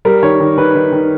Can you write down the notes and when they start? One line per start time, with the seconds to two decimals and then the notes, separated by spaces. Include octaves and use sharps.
0.05 G3 A#4
0.23 D#3 C#5
0.40 D#3
0.58 D#3 B4
0.75 D#3
0.92 D#3